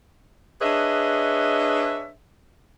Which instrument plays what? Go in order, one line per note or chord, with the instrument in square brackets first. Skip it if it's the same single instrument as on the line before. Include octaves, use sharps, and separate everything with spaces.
[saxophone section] D4 G#4 B4 C#5 D#5 E5